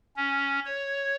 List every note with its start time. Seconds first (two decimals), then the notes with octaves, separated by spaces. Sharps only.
0.17 C#4
0.65 C#5